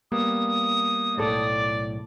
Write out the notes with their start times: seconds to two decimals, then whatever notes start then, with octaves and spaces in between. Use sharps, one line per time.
0.12 G3 A#3 B3 D#6
1.17 B1 A2 A4 D5